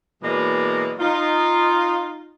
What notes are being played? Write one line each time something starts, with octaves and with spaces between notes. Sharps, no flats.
B2 E3 F#3 G#3 A#3 D5
D#4 F4